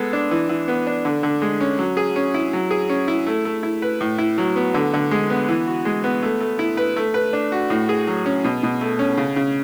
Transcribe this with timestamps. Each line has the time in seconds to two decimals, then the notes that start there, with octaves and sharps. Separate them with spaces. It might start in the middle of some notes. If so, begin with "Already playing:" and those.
Already playing: G#3 B3 A4
0.13 D4
0.31 E3
0.49 E3
0.68 B3
0.87 D4
1.05 D3
1.23 D3
1.42 G#3
1.61 C#4
1.79 F#3
1.97 G#4
2.16 C#4
2.34 E4
2.53 F#3
2.71 G#4
2.89 C#4
3.08 E4
3.27 A3
3.45 A3
3.63 E4
3.82 B4
4.01 A2
4.18 E4
4.38 F#3
4.56 B3
4.74 D3
4.93 D3
5.11 G#3
5.30 B3
5.49 E3
5.67 F#4
5.85 G#3
6.04 B3
6.23 A3
6.40 A3
6.59 E4
6.77 B4
6.96 A3
7.14 B4
7.33 D4
7.52 F#4
7.70 A2
7.89 G#4
8.07 F#3
8.26 C#4
8.44 B2
8.63 B2
8.81 A3
8.99 C#4
9.17 C#3
9.36 C#3